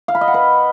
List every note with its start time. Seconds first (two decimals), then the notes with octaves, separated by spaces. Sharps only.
0.08 F5
0.15 B5
0.21 D#5
0.28 F#5
0.34 B4